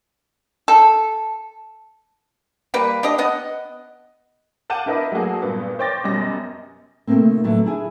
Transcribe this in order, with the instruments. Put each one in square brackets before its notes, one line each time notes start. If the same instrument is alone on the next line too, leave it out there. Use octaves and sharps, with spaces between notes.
[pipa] A4
G3 A#3 B4 B5
D4 G4 D#5
B3 D#5 F#5
[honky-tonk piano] F5 F#5 A5 D6 G6 D#7
D4 E4 A#4 B4 D#5 E5
F#3 A3 A#3 F#4 G#4
G2 A#2 B3
C5 C#5 G5 D6 A6 A#6
F#2 B2 G3 D#5 A#6
[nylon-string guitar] C3 D#3 F3 A3 A#3 C4
A2 D3 F#3 A3 B3
D4 E4 G#4 G#5